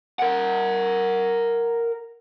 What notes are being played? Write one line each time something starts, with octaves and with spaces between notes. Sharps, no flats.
A#4 F#5